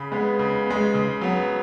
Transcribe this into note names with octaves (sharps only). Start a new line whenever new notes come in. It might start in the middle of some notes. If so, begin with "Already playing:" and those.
Already playing: C#3 B5
G#3 B3
C#3
G#3 B3
C#3
F#3 B3